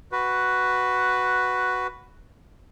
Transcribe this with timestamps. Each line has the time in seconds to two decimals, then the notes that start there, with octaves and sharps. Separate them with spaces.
0.12 F#4 B4